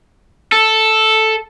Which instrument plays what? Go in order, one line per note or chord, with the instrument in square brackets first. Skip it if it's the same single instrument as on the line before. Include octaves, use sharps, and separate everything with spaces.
[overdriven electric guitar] A4